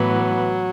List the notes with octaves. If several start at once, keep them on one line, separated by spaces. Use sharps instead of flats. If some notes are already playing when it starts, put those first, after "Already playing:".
Already playing: A2 E3 F#3 B3